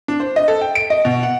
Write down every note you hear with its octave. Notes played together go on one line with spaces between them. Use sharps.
D4
C5
D#5
A4
G5
D7
D#5
B2
F#5